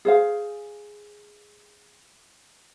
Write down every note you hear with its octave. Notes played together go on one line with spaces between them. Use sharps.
G#4 C5 F5